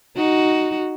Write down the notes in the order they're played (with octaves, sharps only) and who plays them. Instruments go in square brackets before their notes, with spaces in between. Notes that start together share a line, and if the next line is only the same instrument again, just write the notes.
[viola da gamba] D#4 F#4